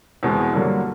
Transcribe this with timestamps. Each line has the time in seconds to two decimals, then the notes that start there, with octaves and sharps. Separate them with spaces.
0.23 E2 B2 G#3 C4
0.53 G2 D3 F#3 A#3